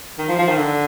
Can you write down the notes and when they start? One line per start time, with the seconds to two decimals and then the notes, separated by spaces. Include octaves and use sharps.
0.19 D#3
0.29 F3
0.39 F3
0.49 D#3
0.58 D3